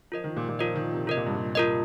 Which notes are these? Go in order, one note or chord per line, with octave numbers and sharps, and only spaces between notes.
F3 F4 A#4 D#5
D#3
A#2
A#2
F3 F4 A#4 D#5
D#3
C3
C3 F4 A#4 D#5
A#2
G2
A#2
F4 A#4 D#5